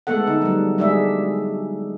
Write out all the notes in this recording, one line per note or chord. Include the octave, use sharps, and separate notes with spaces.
G#3 A3 B3 A4 F#5
D3 D#4
F#3 G3
G3 G#3 D4 G#4 E5